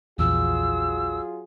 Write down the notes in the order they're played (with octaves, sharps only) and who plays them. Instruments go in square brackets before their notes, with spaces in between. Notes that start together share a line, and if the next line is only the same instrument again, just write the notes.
[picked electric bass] A#1 E2 [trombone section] F#3 F4 G#4 [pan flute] E6